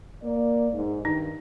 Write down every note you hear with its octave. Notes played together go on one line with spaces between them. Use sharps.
A#3 D5
G#2
G2 D#3 D#4